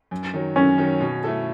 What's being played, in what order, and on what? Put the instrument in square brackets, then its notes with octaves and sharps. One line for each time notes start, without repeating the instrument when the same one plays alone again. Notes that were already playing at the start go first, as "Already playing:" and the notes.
[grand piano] F#2
D#3 F#3
[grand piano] F#2 [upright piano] C#4
[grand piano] D#3 F#3
B2
A3 E4 A4